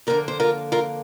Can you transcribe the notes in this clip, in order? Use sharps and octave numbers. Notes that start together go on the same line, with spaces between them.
F2 D3 A#3 A#4 D5
C5
F4 A#4
F4 A#4